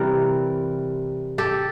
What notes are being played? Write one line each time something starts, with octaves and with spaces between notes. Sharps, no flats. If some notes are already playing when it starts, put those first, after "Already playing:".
Already playing: C3 E3 G3 A#4
G4 A4